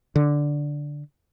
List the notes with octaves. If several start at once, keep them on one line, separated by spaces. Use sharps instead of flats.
D3